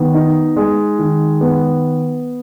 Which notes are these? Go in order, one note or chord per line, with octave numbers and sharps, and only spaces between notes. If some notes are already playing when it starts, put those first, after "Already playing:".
Already playing: D#3 B3
D#4
G#3
D#3
B3